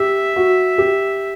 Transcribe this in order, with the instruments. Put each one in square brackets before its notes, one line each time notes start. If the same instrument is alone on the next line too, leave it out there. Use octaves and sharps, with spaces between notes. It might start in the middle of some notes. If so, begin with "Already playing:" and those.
Already playing: [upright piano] G4 [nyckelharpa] E5
[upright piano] F#4
G4